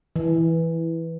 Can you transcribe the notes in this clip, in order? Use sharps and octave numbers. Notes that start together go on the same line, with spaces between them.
E3